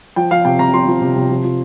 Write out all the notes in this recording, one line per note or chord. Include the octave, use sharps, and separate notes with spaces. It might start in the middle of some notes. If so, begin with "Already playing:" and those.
F3 G5
F3 F5
C3 G5
C3 A#5
F3 C6
F3
C3
C3
F3
F3